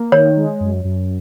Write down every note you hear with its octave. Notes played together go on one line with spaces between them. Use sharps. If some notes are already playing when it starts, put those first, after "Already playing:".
Already playing: A#3
D#3 C#5
G#3
F#2
F#2